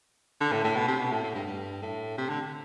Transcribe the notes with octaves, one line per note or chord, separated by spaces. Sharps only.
D3
A2
A2
B2
C3
B2
A2
A2
G2
G2
A2
C3
D3